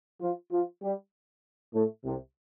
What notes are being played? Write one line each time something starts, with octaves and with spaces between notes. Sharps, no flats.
F3 F4
F3 F4
G3 G4
A2 A3
C2 C3